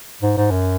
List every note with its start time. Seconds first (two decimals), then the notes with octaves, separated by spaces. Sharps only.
0.22 G#2
0.37 G#2
0.51 F#2